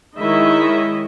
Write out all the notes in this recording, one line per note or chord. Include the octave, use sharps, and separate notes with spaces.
D#3 G#3 E4 C#5 D#5 E5